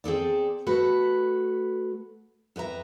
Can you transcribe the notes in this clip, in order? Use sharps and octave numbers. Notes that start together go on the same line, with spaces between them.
C4 G#4 A4 D5
A3 F#4 A4 B4
F2 B4 E5 A#5